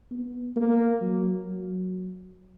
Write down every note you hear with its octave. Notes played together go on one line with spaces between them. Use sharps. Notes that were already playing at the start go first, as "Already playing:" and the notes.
B3
A#3
F#3
F#3